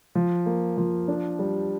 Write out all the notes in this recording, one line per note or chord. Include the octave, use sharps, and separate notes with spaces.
F3
A#3
F3
D4
G3